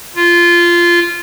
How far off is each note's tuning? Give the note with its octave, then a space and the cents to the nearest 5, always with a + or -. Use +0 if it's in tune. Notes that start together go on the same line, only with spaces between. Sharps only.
F4 -15